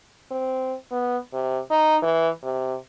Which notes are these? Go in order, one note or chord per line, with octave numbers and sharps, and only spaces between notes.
C4
B3
C3
D#4
E3
C3